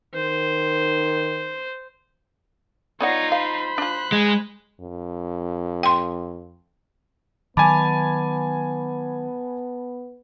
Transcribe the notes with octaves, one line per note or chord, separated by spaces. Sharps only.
D#3 C5
B3 D#4 F4 C#5 D5 F#5 A#6
C5 F5 B5
D4 F4 F#6
G#3
F2
G5 C6
D#3 F#3 B3 G#5 A5 B5 D6 A6